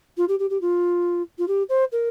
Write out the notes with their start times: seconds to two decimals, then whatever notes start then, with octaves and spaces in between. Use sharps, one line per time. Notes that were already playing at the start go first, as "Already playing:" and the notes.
0.17 F4
0.28 G4
0.39 G4
0.50 G4
0.61 F4
1.38 F4
1.48 G4
1.69 C5
1.92 A#4